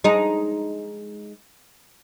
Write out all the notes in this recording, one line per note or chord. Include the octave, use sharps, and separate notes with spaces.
G#3 D#4